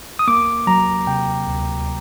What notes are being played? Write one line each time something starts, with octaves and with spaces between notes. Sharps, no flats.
D#6
A#3 D6
F#3 A#5
C3 G5
D2